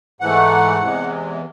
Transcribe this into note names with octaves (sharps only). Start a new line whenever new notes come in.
G#2 E3 A3 F#5
E2 C3 E3 G#3